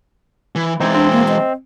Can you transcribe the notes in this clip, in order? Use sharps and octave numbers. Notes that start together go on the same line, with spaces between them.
E3
E3 G#3 C4 D#4
C4 D4
A#3
D#5